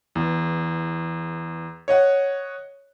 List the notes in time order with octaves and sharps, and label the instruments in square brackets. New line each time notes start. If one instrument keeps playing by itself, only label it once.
[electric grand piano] E2
C#5 D#5 F#5